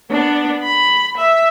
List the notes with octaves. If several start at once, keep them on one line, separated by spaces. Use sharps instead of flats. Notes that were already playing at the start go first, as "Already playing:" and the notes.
B3 D4
B5
E5